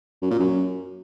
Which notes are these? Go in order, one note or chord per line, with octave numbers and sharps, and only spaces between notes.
F#2
A#2
F#2